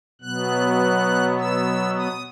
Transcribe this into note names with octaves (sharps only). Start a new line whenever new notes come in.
B2 F#3 B3 F#6
E6
D#6